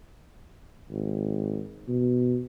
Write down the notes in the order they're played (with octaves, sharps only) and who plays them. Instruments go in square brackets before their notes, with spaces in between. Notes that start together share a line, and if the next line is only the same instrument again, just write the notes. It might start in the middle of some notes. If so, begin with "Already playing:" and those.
[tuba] G#1
B2